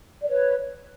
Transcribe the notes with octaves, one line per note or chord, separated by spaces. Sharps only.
D5
B4 C#5